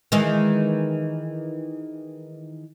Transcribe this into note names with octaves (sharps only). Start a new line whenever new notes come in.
D#3 E3 G#3